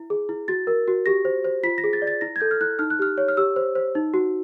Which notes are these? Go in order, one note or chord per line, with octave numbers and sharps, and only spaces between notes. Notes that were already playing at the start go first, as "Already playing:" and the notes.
Already playing: E4
G#4
E4
F#4 A6
A#4
F#4
G4 A#6
C5
C5
F4 B6
A#6
G#4
A6
D5
A6
E4 A#6
G#6
A4 G6
F6
E4 F#6
D#4 F6
F#6
G4 F6
C#5
F6
G4 E6
C5
C5
D#4
F#4